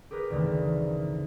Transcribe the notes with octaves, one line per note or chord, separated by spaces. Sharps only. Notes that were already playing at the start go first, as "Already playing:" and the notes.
G4 G#4 A#4 B4
G#1 D2 C#3 E3